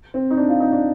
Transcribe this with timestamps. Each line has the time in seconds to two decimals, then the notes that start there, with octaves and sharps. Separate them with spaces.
0.14 C4
0.31 D#4
0.37 D4
0.49 F4
0.60 D#4
0.72 D4